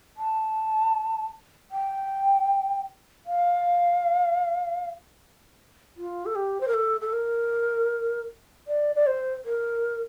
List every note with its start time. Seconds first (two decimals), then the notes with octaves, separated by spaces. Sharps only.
0.17 A5
1.71 G5
3.26 F5
5.97 F4
6.26 A4
6.35 G4
6.61 C5
6.68 A#4
6.74 A4
7.01 A4
7.13 A#4
8.68 D5
8.96 D5
9.07 C5
9.45 A#4